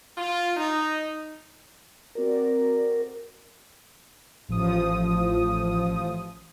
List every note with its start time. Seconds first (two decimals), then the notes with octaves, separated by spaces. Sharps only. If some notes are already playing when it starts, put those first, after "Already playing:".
0.18 F4
0.57 D#4
2.15 C4 F#4 A#4 D5
4.48 A1 F3 D#6